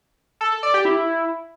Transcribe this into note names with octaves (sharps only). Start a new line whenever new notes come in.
A4
A4
D5
G4
E4